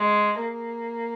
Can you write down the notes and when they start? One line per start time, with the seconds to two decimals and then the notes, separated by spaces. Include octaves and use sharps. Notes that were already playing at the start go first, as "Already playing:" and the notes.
Already playing: G#3
0.41 A#3